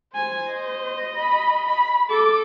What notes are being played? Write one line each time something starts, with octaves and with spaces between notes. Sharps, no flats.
C5 G#5
D#5
B5
B5
A4 D6